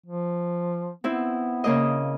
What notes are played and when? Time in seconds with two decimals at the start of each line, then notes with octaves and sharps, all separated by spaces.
0.07 F3
1.04 B3 C4 E4
1.64 C#3 A#3 D#5